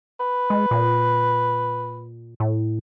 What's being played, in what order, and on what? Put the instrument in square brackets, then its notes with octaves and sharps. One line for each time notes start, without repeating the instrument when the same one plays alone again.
[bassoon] B4
[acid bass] G#3
A#2
A2